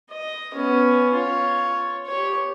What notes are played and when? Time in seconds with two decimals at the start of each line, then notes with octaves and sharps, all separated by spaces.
0.10 D#5
0.54 B3 C#4
1.14 F4 C#5
2.06 G4 C#5